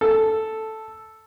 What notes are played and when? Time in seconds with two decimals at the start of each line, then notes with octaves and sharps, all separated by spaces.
0.01 A4